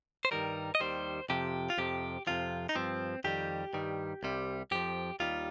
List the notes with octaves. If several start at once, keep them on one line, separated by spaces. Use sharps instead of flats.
C5
G2 D#3 G3 A#4
D#5
D#2 D#3 G3 C5
F2 C3 F3 G4
F4
F2 C3 F3 G4
F2 C3 F3 F4
D#4
G2 F3 C4
F2 D#3 G3 G4
G2 D#3 G3
C2 C3 G3
F2 F3 G4
D#2 D#3 G3 F4